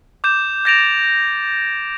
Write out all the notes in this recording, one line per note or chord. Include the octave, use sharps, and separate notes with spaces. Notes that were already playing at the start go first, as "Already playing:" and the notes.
D6 G6 E7
G6 A6 A#6 D7 E7 F7